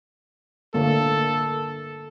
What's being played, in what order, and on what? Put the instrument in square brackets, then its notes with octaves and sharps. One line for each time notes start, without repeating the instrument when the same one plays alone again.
[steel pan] D3 A3 A#3 [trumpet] A4